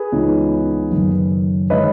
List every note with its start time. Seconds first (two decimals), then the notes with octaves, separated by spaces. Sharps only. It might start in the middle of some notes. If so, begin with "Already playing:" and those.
Already playing: G#4 B4
0.12 C#2 C#3 E3 B3 D#4
0.90 F#1 F#2 D#3
1.70 D#3 G#3 C#4 B4 D#5